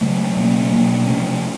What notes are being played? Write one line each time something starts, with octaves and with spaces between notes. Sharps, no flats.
C#3 F#3 A3
B2 F#3 A#3 C#4
B2 F#3 A#3
C3 F3 A3 C#4